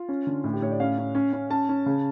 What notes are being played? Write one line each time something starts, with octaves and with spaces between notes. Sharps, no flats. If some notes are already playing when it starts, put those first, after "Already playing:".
Already playing: F4
C#4
D3
A2
G4
A2 C#5
D5
C#4 F5
C#4
C#4
C#4
C#4 A5
C#4
C#3